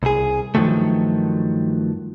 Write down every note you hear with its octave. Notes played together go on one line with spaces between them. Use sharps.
C2 G#4
G2 D#3 F3 F#3 A3